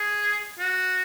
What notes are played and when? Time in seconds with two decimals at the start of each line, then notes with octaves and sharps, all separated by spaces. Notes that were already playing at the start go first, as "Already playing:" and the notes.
Already playing: G#4
0.59 F#4